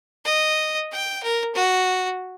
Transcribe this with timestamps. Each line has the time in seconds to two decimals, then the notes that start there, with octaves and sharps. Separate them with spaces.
0.25 D#5
0.92 G5
1.23 A#4
1.55 F#4